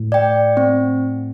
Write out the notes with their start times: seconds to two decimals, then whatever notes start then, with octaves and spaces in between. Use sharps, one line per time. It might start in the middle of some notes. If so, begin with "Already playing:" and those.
Already playing: A2
0.12 D5 G5
0.57 C4